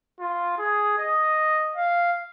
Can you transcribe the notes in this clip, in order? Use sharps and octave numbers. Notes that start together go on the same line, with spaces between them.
F4
G#4
D#5
F5